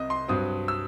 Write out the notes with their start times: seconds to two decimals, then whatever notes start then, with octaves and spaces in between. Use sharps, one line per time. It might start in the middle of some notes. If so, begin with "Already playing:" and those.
Already playing: C2 C3 D#5
0.10 C6
0.28 G2 F#3 C4 D#6
0.68 E6